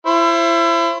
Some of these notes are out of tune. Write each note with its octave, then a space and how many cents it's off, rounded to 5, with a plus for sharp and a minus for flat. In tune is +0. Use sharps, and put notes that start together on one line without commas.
E4 +35 C5 +30